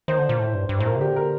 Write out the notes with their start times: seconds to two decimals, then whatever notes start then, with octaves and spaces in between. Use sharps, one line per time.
0.08 D#3 C5
0.18 D3
0.29 A#2
0.40 A2
0.54 G2
0.69 G2
0.79 A2 C5
0.86 A#2 A#4
0.96 C3
1.00 D3 G4
1.16 A#4